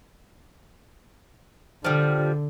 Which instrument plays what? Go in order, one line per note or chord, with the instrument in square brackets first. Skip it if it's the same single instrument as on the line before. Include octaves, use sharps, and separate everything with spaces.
[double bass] D3 [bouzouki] F3 G3